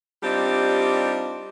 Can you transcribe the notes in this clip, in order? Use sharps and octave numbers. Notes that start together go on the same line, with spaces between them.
G3 C4 D4 D#4 F4 G4